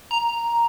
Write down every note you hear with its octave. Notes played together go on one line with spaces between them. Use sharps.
A#5